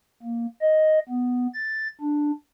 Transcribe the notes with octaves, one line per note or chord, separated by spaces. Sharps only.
A#3
D#5
B3
A6
D4